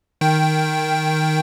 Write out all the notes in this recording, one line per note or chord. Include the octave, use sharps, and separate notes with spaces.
D#3 G5